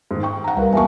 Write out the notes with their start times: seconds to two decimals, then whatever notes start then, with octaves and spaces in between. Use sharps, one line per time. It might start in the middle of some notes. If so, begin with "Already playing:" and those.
0.11 G#2 D#3
0.23 G5 C#6
0.44 F#5 A#5
0.57 C2 A#4 B4 F5
0.73 E1 A#3 E5 G#5 A5 C#6